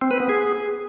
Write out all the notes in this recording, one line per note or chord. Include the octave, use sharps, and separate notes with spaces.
C4
B4
B3
G#4